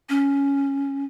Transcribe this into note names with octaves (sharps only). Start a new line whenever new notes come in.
C#4